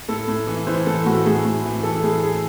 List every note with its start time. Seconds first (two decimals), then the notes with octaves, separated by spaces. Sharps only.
0.09 A2 A4
0.28 A2
0.47 E3
0.67 E3 C5
0.86 A2 A4
1.06 A2 F#4
1.25 A2 G#4
1.45 A2
1.65 E3
1.83 E3 A4
2.03 A2 G#4
2.23 A2 G#4